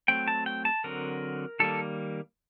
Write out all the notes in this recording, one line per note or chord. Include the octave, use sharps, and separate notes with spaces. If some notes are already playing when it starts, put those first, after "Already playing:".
F#3 A3 C4 G5
A5
G5
A5
D3 F#3 C4 A#4
D#3 G3 A#3 A4